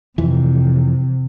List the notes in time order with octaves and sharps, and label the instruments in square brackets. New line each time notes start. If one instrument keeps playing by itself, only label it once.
[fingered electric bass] F2 E3 [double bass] C3